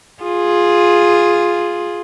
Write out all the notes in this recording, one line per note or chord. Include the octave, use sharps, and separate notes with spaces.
F4 G#4